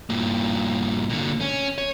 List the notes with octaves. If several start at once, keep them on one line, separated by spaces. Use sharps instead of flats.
G2 A#2
A#2 D3
C#4
C#5